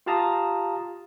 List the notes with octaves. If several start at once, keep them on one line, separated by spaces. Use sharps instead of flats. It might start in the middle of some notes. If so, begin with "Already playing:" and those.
F4 G4 F5 A5 A#5 D#6